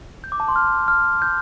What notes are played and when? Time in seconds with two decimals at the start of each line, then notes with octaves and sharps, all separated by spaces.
0.24 G6
0.32 D6
0.40 A5
0.48 C6
0.56 F6
0.88 F6
1.22 G6